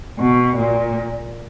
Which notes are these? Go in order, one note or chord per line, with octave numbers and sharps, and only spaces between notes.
B2
A#2